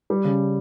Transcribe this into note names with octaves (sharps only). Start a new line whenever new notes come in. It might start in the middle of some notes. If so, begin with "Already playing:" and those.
G3
C#3